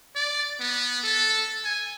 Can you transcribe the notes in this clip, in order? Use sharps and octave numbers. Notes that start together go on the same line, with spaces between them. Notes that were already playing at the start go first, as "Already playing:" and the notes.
D5
B3
A4
G#5